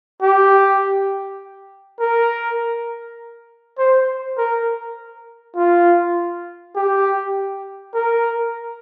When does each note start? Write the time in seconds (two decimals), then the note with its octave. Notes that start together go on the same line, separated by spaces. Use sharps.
0.22 G4
2.00 A#4
3.78 C5
4.38 A#4
5.57 F4
6.75 G4
7.95 A#4